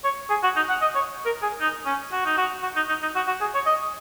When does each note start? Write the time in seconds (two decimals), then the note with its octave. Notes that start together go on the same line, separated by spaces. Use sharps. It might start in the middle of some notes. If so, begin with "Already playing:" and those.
0.04 C#5
0.30 G#4
0.43 F#4
0.56 D#4
0.69 F#5
0.81 D#5
0.95 C#5
1.26 A#4
1.42 G#4
1.60 D#4
1.86 C#4
2.12 F#4
2.25 D#4
2.37 F#4
2.63 F#4
2.76 D#4
2.89 D#4
3.02 D#4
3.15 F#4
3.27 F#4
3.41 G#4
3.54 C#5
3.66 D#5